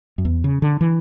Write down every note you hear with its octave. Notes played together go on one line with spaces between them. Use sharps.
F#2
E2
C#3
D3
E3